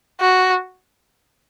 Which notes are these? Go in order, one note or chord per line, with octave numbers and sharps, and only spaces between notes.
F#4